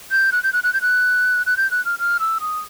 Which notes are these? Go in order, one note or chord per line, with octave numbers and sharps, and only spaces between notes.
G6
F#6
G6
F#6
F#6
G6
F#6
F#6
G6
F#6
F6
F6
E6
D#6